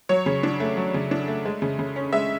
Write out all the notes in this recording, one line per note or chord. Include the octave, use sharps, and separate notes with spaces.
F#3 C#5
C#3
D4
A3
F#3
C#3
D4
A3
G#3
C#3
C#3
C#4
G#3 E5